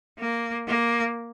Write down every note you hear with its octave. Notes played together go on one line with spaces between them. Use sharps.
A#3
A#3